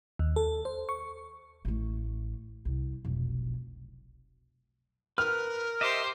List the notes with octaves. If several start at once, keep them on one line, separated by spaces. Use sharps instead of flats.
D#2
A4
C5
C#6
A1 A3
C2
F1 B1
A#4 B4 F6
G4 C5 D#5 E5 D6